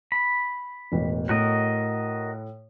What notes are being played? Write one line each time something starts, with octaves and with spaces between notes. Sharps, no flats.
B5
E1 A1
A2 F#4 A#4 D#5